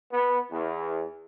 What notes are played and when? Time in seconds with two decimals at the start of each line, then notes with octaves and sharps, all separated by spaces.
0.11 B3
0.51 E2